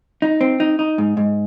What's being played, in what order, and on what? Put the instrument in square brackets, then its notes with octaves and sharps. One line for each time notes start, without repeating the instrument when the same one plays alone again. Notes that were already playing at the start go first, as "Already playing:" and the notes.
[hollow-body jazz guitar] D#4
C4
D#4
D#4
G#2
G#2